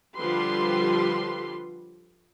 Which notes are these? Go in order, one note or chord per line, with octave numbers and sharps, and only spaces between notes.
D3 F3 G3 G4 B4 C6